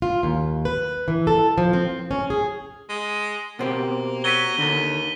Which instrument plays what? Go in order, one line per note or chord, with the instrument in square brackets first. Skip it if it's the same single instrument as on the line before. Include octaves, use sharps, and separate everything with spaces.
[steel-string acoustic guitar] F4
D#2
B4
E3
A4
F3
C4
C#4
G#4
[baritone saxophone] G#3
[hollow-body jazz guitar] B2 C4 G4 [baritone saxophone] A#3
[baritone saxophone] F#3 [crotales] B6 D#7 G7
[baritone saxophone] D#2 [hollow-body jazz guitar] D3